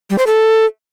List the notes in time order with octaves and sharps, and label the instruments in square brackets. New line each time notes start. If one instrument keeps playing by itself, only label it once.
[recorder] G3
C5
A4